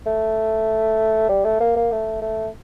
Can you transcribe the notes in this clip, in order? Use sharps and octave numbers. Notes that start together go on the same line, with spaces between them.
A3
G3
A3
A#3
A#3
A3
A3